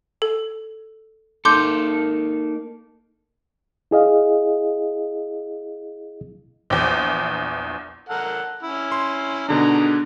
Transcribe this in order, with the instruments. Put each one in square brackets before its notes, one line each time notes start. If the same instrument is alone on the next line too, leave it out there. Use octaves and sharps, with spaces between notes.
[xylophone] A4
[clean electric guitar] A#3 D#4 A4 [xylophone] C6 D6 G6
[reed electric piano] E4 G#4 D#5 F5
[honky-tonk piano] A#1 E2
[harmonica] A4 A#4 F#5
C#4 E4
[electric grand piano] C6
[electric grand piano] B2 D3 D4 [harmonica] D#3 G#4 A#5